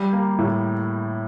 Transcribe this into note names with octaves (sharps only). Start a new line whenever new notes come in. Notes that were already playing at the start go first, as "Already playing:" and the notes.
Already playing: G3
A#3
A2